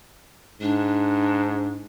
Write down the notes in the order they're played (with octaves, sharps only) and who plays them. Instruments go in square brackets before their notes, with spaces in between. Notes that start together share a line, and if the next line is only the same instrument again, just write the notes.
[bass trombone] G#2 [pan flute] D4